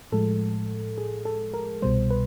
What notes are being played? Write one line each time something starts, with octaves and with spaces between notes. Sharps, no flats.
A2 F3 G#3 A4
G#4
A4
A#4
C2 B2 G3 C5
B4